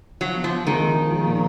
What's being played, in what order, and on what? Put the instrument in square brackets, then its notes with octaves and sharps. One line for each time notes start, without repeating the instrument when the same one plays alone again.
[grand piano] F3 [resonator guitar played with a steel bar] F#3
[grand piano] B3
[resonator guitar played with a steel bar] F3
[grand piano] B3
[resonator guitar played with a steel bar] D#3 [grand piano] G#3
[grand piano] G#3
F3
F3
A#2